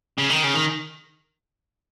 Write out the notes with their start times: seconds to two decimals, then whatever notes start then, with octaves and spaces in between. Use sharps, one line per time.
0.18 C#3
0.30 D#3
0.44 C#3
0.54 D#3